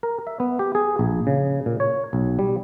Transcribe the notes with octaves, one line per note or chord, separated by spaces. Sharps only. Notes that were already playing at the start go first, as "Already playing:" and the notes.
A#4
E5
B3
G4
G#4
A#1
C#3
A#2
C#5
B1
G3